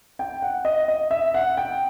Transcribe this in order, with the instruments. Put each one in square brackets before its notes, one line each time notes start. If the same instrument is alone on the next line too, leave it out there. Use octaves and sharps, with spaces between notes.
[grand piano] G5
F#5
D#5
D#5
E5
F#5
G5